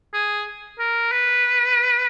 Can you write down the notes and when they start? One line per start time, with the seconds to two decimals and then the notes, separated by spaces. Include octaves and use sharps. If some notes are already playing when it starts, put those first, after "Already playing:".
0.14 G#4
0.79 A#4
1.12 B4